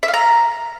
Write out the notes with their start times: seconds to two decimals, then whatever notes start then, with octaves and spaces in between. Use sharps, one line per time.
0.03 E5
0.08 F5
0.14 A#5